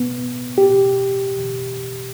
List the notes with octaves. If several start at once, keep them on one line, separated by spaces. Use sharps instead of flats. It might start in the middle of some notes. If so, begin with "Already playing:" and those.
Already playing: B3
G4